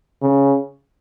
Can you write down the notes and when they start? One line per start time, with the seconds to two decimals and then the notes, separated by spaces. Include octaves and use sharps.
0.22 C#3